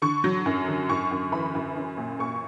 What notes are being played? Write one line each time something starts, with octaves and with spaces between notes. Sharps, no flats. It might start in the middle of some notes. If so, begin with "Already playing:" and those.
D3 C#6
F#3
F#2
D3
F#2 C#6
F#2
E3 B5
F#2
C#4
A#2
A#2 C#6